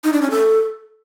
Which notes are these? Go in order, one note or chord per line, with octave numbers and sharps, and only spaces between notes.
D#4
D4
C#4
A4